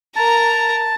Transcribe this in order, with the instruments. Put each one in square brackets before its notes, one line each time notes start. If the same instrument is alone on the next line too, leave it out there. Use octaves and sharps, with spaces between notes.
[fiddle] A#4 A#5 [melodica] A5